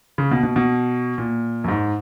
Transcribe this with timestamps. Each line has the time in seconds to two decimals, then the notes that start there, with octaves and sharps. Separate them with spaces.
0.18 C#3
0.31 B2
0.43 B2
0.56 B2
1.18 A#2
1.64 F#2
1.68 G#2